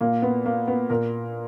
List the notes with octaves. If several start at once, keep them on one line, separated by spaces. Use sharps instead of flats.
A#2 A#3
B3
A#3
B3
A#2 A#4